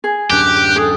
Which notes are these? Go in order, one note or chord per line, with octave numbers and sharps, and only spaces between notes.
G#4
D1 F#2 D4 G4 F#6
G#4 A4 G5 D#6